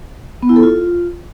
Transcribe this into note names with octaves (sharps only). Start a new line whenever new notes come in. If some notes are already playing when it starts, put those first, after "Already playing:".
B3
E4
A4
F4